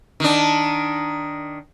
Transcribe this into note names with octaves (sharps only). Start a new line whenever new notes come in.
D#3 D4